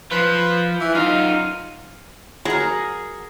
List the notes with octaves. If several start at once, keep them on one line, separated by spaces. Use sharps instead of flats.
F3 F4 B4
E3
F#2 D#4 F4
F#3 G#4 A#4 F#5